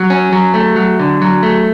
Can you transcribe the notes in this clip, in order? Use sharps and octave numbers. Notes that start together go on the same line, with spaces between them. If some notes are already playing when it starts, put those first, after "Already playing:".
Already playing: F#3
C#4
F#3
A3
F#3
D3
F#3
A3